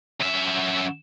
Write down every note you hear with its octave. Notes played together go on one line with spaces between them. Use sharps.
F#2 E5